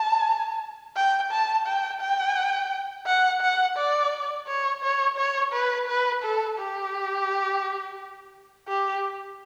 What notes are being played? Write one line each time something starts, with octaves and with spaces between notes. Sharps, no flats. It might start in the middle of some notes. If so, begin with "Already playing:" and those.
Already playing: A5
G5
A5
G5
G5
F#5
F#5
D5
C#5
C#5
C#5
B4
B4
A4
G4
G4